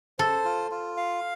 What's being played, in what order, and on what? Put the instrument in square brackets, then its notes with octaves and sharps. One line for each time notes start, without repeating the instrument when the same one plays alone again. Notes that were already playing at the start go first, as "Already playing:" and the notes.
[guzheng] A4 [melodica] C5
[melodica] F4
F4
F5